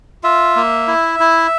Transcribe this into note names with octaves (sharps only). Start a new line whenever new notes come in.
F4 E5
A#3
E4
E4